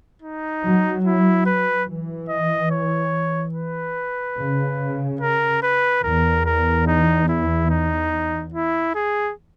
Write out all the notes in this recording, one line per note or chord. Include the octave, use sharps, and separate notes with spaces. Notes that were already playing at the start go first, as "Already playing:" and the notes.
D#4
F#3
E4
B4
E3
D#5
C#5
B4
C#3
A#4
B4
E2 A#4
A#4
D#4
E4
D#4
E4
G#4